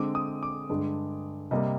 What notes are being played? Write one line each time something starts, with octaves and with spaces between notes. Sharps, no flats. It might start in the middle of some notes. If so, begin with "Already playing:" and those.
Already playing: D3 G#3 C4 D6
D#6
D6
G2 D3 G#3
C3 G3 A#3 D#5